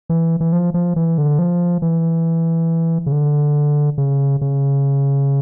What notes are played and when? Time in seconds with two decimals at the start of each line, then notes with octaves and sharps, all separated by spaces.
0.09 E3
0.40 E3
0.52 F3
0.74 F3
0.96 E3
1.18 D3
1.39 F3
1.82 E3
3.06 C#3
3.12 D3
3.98 C#3
4.41 C#3